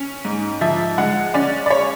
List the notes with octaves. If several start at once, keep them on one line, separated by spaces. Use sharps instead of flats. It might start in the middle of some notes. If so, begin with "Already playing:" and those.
Already playing: C#4
G#2
F3 E5
G#3 F#5
C#4 D5
D5
C#5